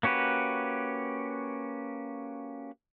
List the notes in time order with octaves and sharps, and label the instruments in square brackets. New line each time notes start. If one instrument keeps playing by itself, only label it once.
[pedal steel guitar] A#3 C#4 F#4 G4 B4